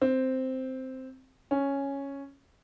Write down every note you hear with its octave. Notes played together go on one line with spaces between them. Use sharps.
C4
C#4